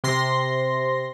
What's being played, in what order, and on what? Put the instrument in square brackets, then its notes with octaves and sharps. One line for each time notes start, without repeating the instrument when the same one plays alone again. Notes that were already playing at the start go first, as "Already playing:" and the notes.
[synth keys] C3 C6 A#6